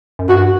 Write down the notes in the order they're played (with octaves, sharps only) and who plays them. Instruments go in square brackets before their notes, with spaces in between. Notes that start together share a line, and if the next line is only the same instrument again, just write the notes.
[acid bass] F#2
[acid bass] G2 [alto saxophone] F#4